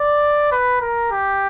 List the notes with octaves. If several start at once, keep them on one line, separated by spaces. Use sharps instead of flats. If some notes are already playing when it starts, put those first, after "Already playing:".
Already playing: D5
B4
A#4
G4